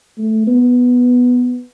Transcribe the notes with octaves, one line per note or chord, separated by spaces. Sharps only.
A3
B3